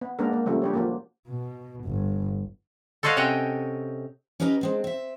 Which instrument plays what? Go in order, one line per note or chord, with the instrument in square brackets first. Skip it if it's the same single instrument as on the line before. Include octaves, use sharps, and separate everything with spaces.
[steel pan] B3
G#3 A#3 B3 D4 A#4
A#3
C#3 F3 G3 A3 A#3
D4 G4 C#5
F3 F#3 A#3
[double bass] B2
G1
[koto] A4 C5 C#5 D#5 F5 F#5
C3 C#4 D#5 F#5 G5
[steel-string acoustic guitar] C#4 G4 B4 D#5 F#5 A#5
G#3 C4 D4
C4 E5